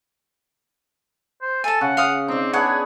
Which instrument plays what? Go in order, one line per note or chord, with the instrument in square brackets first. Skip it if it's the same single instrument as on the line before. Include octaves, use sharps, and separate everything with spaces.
[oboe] C5
[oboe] A4 [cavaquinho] G#5 A5
[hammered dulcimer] C#3 [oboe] F#5
[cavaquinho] F5 D#6
[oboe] C4 [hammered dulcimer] D#4 D5
[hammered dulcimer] B3 D4 G#4 [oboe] C#5 [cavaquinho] F#5